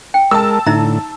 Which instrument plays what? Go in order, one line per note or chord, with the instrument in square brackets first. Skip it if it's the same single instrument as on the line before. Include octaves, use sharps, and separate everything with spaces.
[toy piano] G5
[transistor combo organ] G#3 A#4 [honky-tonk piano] A5 E6
[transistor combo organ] A2 D3 [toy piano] D#4 E5 A#5